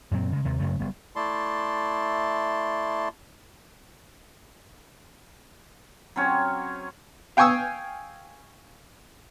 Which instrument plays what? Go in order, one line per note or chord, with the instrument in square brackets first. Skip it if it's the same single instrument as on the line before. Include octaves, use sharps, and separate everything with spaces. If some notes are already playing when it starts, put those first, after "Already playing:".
[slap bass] F#2 A#2 F#3 C4
C#3 G#3
D#2 C3 G#3
F#2 C#3 F#3 A3
F#1 G3 B3
[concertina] A3 E4 D5 A5 C6
[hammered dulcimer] F#3 C4 C#4 C#5
[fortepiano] F5 G5 G#5 C#6 D#6 E6